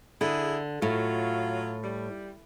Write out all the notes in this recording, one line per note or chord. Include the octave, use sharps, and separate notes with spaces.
D3 E4 G#4
A2 F#3 F4
G3